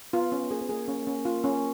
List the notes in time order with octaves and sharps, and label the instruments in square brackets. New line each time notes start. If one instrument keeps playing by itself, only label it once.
[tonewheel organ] B3 [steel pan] F4
[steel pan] C#4
[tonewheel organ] A#3 [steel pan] G#4
[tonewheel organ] B3
[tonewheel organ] A#3 [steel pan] G#4
[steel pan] C#4
C#4
F4
C#4